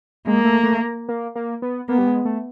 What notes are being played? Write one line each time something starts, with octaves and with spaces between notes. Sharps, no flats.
G#3 A#3
A3
A3
A#3
A#3
B3
A#3 B3
G3
G#3
A3